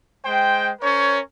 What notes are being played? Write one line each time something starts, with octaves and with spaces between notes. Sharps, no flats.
G#3 C5 G5
C#4 A#4 C5 C#5